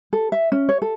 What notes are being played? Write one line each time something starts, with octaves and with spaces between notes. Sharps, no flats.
A4
E5
C#4
C#5
A4